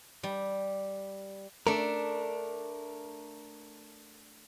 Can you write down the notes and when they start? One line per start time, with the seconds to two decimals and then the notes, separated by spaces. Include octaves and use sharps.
0.23 G3
1.67 A3 D4 A#4